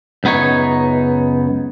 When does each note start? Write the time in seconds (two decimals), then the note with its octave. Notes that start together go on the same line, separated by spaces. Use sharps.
0.24 C#2 F#2 B3 D#4 C#5